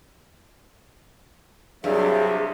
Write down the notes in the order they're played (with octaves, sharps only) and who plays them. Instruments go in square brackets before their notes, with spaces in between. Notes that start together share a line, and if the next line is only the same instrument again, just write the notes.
[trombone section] C2 [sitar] G2 [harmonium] F#3 E5 [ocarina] G#4